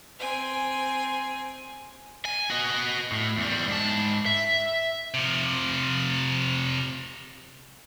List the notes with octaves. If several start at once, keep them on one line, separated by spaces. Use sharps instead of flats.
C4 G#5
G#5
F#4 D#5
A2
E2 G3
G#2 A5
E5
C3 F3